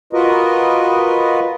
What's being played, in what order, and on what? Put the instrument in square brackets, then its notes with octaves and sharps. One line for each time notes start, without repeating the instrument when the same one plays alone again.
[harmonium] F4 F#4 A#4 B4 D#5